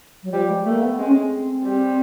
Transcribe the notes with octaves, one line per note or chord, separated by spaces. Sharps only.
F#3
F3 G3
G#3
A3 A#3
B3
G#3 C4
C#4
C4
G3